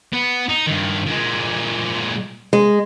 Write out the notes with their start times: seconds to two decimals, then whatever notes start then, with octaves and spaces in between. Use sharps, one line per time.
0.13 B3
0.50 D#4
0.67 G2 D#3
1.07 A#2 G#3
2.53 G#3